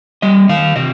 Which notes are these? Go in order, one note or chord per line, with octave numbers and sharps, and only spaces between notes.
G3 D#5
D#3 F5
C3 D#5